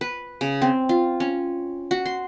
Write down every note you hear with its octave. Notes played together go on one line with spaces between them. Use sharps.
B4
C#3
C4
F4
C#4
F#4
C6